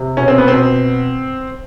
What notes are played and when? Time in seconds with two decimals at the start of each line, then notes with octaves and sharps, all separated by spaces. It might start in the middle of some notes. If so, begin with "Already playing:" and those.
Already playing: C3
0.17 B2 C#4
0.28 C4
0.38 B3
0.48 C4
0.54 B2